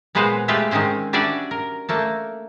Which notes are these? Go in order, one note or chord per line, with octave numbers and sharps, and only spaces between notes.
A#2 G#3 B3 B4 C5 F5
G#3 A3 F4 G4 B4 E5
D#3 G#3 C4 C#4 C5
G3 C#4 D4 F#4 D5 E5
A#4
A3 A#3 A4